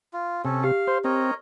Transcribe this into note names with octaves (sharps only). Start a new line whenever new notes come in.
F4
C3 C#4 A4
G4 F5
C5
C4 A#4 C#5 D#5